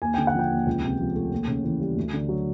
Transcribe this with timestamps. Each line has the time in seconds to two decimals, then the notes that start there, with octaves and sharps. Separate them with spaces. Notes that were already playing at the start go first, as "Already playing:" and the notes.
0.02 D#2 G#5
0.14 D3 G5
0.27 F#5
0.35 F3 G5
0.51 D#2
0.66 C#2
0.84 C3
1.00 F3
1.15 A3
1.32 D#2
1.48 C#3
1.64 E3
1.80 G3
1.96 D2
2.14 D3
2.29 F#3